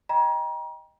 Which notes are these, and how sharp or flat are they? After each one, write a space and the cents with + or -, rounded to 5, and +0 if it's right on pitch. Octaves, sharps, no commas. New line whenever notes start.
D#5 +0 G5 +15 A#5 +35